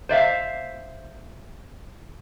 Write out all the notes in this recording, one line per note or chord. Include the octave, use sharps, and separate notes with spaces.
C5 D5 E5 F5